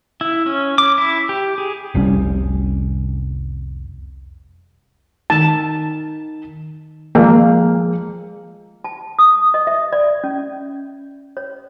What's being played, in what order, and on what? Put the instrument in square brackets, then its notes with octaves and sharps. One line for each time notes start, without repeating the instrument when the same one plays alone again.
[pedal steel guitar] E4
C#4
D6
E4
G4
G#4
[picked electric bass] F1 C2 G3 C#4
[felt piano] D#3 [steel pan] A5
[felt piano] F3 G#3 [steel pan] A#3
[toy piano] A5
D#6
D#5
E5
D5
C#4
C#5